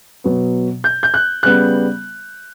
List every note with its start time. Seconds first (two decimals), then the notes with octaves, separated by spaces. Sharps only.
0.24 B2 F#3 B3
0.84 G6
1.03 G6
1.14 F#6
1.43 C#3 G3 B3 F#6